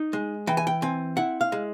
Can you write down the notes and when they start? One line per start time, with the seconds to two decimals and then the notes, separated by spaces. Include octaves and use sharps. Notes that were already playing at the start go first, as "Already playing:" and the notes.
Already playing: D#4
0.13 G#3
0.47 E3 G5
0.57 G#5
0.67 G5
0.82 C4 G#5
1.17 E4 F#5
1.41 F5
1.52 G#3